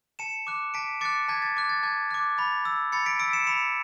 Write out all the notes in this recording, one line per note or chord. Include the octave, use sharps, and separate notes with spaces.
A5 C#7 E7
D6 F#6
A5 B6 D7
D6 F#6 A6 C#7
A5 G#6 B6
A6
D6 F#6
A6
A5 G#6
D6 F#6
B5 A6
E6
B5 A6 C#7
B6 D7
E6 B6 D7
C#7 E7
B5 C#7 E7